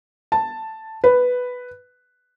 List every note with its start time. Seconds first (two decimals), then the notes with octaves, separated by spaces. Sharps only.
0.32 A5
1.04 B4